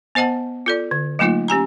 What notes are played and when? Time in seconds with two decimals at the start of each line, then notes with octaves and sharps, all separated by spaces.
0.15 B3 C5 D#5 F#5 A5
0.66 F4 A4 D5
0.91 D3
1.19 F#3 A3 A#3 D#4 F4
1.48 C#4 G4 G#5 A#5